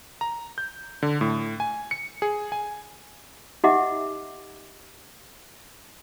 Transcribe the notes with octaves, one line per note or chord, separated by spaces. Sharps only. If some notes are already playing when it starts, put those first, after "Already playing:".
A#5
G6
D3
A2
G#5
C#7
G#4
G#5
D#4 G4 D#5 E5 F#5 D6